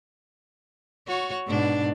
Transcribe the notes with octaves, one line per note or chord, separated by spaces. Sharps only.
F#4 C#5
G#2 B2 D4